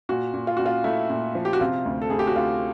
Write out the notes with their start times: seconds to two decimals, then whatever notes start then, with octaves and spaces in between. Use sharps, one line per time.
0.09 A#2 F#4
0.34 A#2
0.47 F4
0.57 A#2 F#4
0.66 F4
0.84 A3 E4
1.10 A#2
1.35 F3
1.45 G4
1.53 F#4
1.61 C3 F4
1.86 D2
2.02 A4
2.10 D2 G#4
2.19 G4
2.27 F#4
2.36 D2 F4